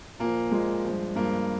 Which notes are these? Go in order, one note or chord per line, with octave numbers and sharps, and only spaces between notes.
A#2 F3 A#3
A#2 F3 G#3
G2 F3
G2 F3 A#3